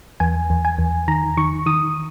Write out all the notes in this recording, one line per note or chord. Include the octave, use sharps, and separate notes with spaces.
E2 G#5
E2
G#5
E2
D#3 A#5
D#3 C#6
D#3 D#6